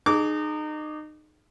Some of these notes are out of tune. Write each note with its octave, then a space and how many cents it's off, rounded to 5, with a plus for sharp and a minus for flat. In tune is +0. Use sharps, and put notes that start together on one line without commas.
D#4 -30 G#4 +20 D6 -20